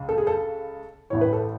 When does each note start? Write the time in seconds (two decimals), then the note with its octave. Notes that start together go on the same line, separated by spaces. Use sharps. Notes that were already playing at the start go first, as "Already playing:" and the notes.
Already playing: C#2 C#3
0.09 A4
0.18 G#4
0.27 A4
1.10 A1 A2 E3 C#5
1.21 B4
1.33 A4